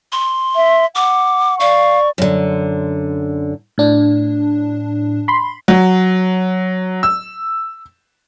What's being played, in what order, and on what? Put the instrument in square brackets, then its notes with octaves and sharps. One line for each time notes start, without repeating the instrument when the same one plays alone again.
[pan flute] C6
[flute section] E5
[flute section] F#5 [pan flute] D6
[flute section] D5 C#6 [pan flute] F5
[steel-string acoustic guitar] F#2 D3
[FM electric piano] A2 D4
B5 C6
[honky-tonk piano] F#3
E6